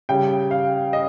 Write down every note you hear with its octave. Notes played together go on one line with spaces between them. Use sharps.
C#3 G3 G5
F5
D#5